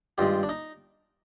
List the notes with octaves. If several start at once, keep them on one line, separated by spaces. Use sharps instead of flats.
G2 D#3 G#3 F4 G4
D4
D#4